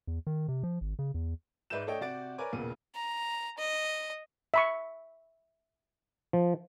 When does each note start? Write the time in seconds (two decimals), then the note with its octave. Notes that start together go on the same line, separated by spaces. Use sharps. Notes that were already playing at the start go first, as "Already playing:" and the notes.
0.07 E2
0.27 D#3
0.48 C3
0.63 F3
0.81 G#1
0.99 C#3
1.14 E2
1.70 G#2 B4 D5 E5 G6 E7
1.87 A3 D4 A4 C#5 D#5 G5
2.01 C3 F#4 D5 A6 D7
2.38 A#4 B4 C#5 D5 G#5 D6
2.53 E1 A#2 C#3 B3 D#7
2.95 A#5
3.58 D#5
4.54 E5 B5 C#6
6.33 F3